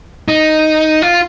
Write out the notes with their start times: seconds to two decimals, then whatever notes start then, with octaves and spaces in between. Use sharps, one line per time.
0.28 D#4
1.02 F4